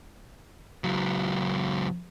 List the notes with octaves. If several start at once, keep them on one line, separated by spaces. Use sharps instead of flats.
C#2 F#3